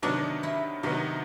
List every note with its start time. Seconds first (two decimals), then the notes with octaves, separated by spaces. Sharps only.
0.03 C3 D#3 F#3 B3 D4 D#4
0.43 E4
0.83 C3 D#3 F#3 B3 D#4 F#4